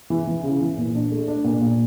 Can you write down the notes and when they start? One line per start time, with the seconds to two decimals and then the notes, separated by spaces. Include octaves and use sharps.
0.10 E3
0.27 E3
0.43 C#3
0.61 E3
0.78 A#2
0.95 D4
1.12 A3
1.28 D4
1.44 A#2
1.61 A#2